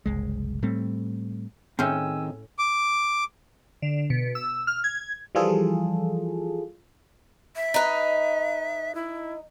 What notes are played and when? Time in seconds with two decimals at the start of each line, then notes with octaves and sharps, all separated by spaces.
0.06 F#1 C2 G#3
0.62 A2 G3 A3 C4
1.79 A2 D#3 C4 C#4 G#4 G5 G#5 E6
2.59 D6
3.82 D3
4.10 B2
4.35 E6
4.67 F6
4.84 G#6
5.35 E3 F3 G3 F4 G#4 A4
7.56 E5
7.74 D#4 B4
8.95 E4